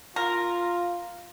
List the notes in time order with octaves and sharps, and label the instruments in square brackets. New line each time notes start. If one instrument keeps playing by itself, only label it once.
[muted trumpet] F4 [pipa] A#4